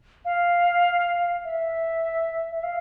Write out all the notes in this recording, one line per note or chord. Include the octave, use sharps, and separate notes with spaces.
F5
E5
E5
F5